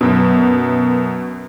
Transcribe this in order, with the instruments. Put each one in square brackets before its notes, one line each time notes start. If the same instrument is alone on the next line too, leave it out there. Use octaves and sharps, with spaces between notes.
[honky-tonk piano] F#2 B2